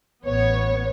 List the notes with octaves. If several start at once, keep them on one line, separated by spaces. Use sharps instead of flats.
A1 B3 C#5